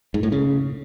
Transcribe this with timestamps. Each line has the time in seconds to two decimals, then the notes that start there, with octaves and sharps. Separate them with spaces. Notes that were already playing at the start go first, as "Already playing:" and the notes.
0.14 G#2
0.23 A2
0.32 C#3